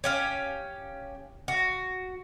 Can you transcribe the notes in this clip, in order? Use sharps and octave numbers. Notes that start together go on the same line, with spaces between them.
C#4 G4 F5
F#4